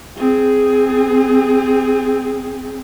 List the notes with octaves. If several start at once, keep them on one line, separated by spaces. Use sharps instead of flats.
C4 G#4